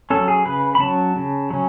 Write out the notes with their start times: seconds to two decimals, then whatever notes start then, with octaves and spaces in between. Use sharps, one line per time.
0.10 F#3 C#4 A4
0.28 G#4
0.46 C#3 B4
0.75 B5
0.80 F#3 C#4 A5
1.16 C#3
1.50 F#3 C#4